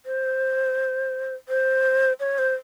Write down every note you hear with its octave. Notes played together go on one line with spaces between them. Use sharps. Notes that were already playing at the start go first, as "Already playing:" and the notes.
C5
C5
C#5
C5